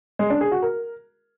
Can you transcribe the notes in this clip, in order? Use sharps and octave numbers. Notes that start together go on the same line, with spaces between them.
G#3
D4
G#4
F#4
A#4